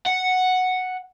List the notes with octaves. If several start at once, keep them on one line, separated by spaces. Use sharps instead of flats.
F#5